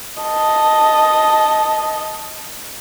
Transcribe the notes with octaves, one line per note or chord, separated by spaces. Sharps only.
D#5 A5